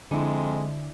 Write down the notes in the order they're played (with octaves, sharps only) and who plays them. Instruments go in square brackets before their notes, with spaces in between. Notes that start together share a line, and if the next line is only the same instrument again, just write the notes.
[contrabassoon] F2 [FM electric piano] D3 [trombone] G#3 [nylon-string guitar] D4 E4